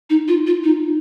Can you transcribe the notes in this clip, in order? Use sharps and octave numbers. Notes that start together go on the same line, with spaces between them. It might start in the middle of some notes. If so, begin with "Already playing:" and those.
D#4
F4
F4
D#4